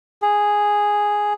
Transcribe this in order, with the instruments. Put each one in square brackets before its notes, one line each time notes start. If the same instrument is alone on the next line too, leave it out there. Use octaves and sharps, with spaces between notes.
[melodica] G#4